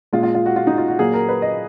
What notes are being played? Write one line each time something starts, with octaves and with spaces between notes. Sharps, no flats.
A#2 G#3 F4
F4
F4
F#4
F4
D#4
F4
F#4
A#2 F#3 A#3 G#4
A#4
B4
D#5